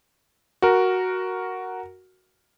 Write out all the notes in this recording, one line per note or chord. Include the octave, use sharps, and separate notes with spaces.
F#4 A#4